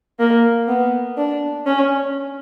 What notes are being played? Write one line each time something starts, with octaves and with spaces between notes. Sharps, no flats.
A#3
B3
D4
C#4